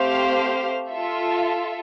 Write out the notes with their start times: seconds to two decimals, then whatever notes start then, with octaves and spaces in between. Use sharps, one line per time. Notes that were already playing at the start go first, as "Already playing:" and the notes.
Already playing: A3 C4 G4 C5 F5
0.89 F4 A4 E5